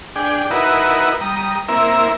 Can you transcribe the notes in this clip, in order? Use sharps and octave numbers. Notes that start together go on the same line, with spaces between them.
D4 G#4 G5
D#4 E4 F#4 A#4 B4
G3 A#5 D#6
A#3 C4 E4 A#4 E5